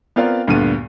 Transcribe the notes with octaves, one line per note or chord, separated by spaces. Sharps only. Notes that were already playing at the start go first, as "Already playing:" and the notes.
B3 C4 F4 A#4 D5 F5
D2 G2 A#2 D3 B3 D#7